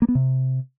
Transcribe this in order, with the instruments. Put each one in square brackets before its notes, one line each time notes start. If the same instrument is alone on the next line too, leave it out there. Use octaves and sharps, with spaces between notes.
[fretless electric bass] A#3
B3
C3